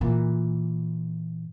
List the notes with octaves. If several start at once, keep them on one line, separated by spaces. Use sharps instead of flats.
A#2 E3